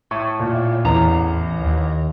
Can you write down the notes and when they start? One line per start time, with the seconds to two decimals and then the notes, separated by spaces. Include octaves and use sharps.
0.11 A2 C#6
0.39 A#2
0.85 A1 E2 A#5
1.60 D#2